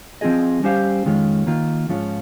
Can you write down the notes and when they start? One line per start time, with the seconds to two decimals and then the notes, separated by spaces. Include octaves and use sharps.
0.21 F3 C4 F4 G#4 D#5
0.63 G3 C#4 G4 C5 F5
1.05 F2 D#3 G#3 C#4 F4
1.47 D#3 A#3 F4
1.89 G#2 F3 G#3 C#4 F4